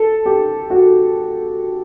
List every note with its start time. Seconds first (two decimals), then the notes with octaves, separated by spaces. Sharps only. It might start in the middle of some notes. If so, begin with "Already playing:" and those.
Already playing: A4
0.26 G4
0.70 F#4